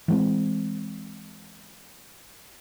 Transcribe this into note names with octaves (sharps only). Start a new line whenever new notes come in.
E3 G#3 C4